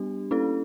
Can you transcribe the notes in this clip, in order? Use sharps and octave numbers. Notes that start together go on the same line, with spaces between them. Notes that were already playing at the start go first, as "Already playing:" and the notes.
Already playing: G3 B3 D4 G4
A#3 C#4 E4 A4